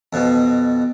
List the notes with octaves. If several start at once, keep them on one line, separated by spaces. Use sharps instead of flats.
F2 B2